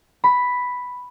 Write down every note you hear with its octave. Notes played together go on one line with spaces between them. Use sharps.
B5